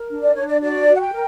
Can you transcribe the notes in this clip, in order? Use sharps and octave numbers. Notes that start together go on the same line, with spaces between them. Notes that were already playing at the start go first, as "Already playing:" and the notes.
Already playing: A#4
D4
D5
D4 C#5
D5
F#4 D5
F#4
F#5
G5
A#4